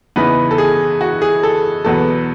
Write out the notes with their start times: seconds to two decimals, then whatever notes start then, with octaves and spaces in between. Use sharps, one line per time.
0.16 E2 C#3 E3 B3 D#4 B4
0.51 A4
0.58 G#4
1.01 F#4
1.22 G#4
1.43 A4
1.85 E2 B2 F#3 B3 A4